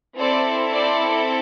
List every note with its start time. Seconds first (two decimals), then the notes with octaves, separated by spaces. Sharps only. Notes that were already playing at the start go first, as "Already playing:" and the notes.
0.18 C4 E4 A4 C5 D5
0.73 C5 D5